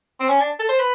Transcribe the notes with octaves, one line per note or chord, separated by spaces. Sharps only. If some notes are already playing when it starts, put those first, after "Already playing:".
C4
C#4
D4
A4
C5
B4